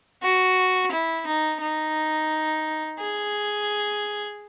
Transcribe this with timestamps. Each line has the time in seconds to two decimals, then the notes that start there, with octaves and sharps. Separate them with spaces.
0.22 F#4
0.91 E4
1.26 D#4
1.61 D#4
2.99 G#4